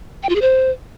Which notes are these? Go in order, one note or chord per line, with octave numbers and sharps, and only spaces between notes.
G5
F4
G#4
C5